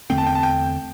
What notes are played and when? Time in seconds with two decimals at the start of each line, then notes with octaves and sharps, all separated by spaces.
0.10 E2 D3 A3 C4 G5
0.18 A5
0.26 G5
0.35 A5
0.43 G5